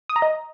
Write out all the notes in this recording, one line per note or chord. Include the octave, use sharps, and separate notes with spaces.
D#6
A#5
D#5